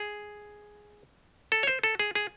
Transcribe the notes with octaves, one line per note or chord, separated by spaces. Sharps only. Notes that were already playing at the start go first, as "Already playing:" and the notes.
Already playing: G#4
A4
C#5
C5
A4
G#4
G#4